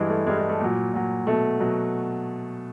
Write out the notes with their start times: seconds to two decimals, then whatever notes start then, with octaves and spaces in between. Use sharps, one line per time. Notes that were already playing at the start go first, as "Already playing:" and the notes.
Already playing: G2 E3 G3 G#3
0.10 A3
0.27 G2 E3 G3 G#3
0.38 G#3
0.49 A3
0.60 A#2 F#3
0.93 A#2 F#3
1.27 B2 F#3 A3
1.60 B2 F#3